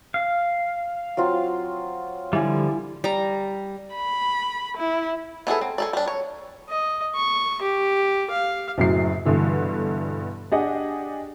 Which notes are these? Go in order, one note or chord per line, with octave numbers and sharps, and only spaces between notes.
F5
F#3 C4 F4
D3 F3 G3 E4 F5 G#5
G3 A#5
B5
E4
B3 E4 G#4 A4
C4
G#4 A4 D5
G3 D4
C#5
D#5
C#6
G4
F5
F#1 F#2 A2 F#3 C7
G2 B2 D3 E3
D4 G4 G#4 D#5 F#5